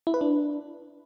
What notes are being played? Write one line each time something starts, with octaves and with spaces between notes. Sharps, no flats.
E4
B4
D4